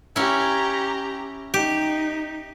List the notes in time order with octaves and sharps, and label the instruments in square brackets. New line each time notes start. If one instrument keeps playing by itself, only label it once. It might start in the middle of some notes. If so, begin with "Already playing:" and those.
[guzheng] C#4 E4 [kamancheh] G4 A#5
[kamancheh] D#4 [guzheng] G4